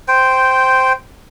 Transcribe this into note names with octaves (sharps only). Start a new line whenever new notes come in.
C5 G5